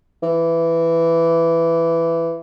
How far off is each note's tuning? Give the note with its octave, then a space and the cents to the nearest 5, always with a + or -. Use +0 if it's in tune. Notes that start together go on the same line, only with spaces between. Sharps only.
E3 +10